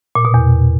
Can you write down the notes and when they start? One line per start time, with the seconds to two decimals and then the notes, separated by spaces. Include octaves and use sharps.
0.15 A#2
0.25 B2
0.34 E2